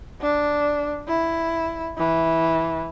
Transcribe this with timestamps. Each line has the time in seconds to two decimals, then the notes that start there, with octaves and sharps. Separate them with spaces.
0.21 D4
1.08 E4
1.98 E3